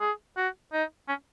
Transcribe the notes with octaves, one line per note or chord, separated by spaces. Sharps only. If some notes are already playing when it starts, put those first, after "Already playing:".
G#4
F#4
D#4
C#4